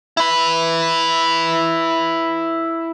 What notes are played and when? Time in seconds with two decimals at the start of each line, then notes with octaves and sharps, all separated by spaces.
0.17 E4 B4